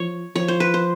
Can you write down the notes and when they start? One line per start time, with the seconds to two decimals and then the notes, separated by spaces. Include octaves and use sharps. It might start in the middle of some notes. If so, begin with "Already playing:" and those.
Already playing: F3 C#5
0.36 F3 C#5
0.48 C5
0.60 B4
0.74 C5